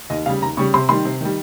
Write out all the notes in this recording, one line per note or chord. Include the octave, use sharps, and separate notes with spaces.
D#2 D#5
C#3 G3 F5
D#2 A#5
C#3 G3 C#6
C3 C6
D#3 G3 C6
C3
D#3 G3